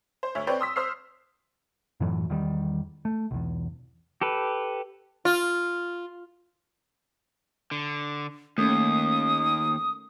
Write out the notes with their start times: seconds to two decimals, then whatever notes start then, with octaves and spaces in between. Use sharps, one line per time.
0.23 C5
0.35 D2 C#5 E5
0.47 C4 B4 C#5 D5 G5
0.60 C6 D#6 E6 B6
0.76 C5 E6 F6 C7
2.00 F#2 A2 E3 F#3
2.30 E2 D#3 G3
3.05 A3
3.31 B1 E2
4.21 G4 A4 B4
5.25 F4
7.71 D3
8.58 D#2 A3 A#3 C#4 D#6